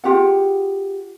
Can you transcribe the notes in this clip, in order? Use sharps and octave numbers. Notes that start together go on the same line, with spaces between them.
F4 G4 G#4 F#5